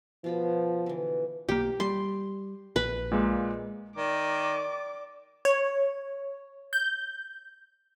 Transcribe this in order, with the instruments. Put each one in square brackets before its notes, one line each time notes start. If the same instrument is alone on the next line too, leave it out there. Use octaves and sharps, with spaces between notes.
[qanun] B2 F4 B5 [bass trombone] F3
[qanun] D3 E3
[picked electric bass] B1 A#3 [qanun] G4
[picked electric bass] G3 [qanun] C6
[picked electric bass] A#1 [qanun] B4
[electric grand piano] A#2 G#3 A#3
[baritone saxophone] D#3 [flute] D5 [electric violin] D6
[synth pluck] C#5
G6